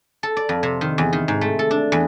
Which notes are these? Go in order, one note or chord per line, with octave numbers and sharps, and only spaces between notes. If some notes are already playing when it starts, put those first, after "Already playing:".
A4
D5
F2
C3
D#3
E2
D#3
G#2
A3
A4
D4
E2